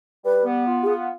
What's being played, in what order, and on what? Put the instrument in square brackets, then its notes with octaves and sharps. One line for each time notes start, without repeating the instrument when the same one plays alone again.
[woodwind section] G3 [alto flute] B4
[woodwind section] B3
F4
[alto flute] G4
[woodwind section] B3 [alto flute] G#4